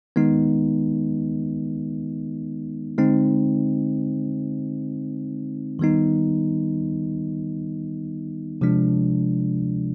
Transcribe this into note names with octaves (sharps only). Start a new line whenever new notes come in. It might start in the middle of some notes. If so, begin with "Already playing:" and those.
D#3 G#3 B3 D#4
D3 G#3 C4 D#4
D#3 G3 B3 D#4
C3 F3 G#3 D4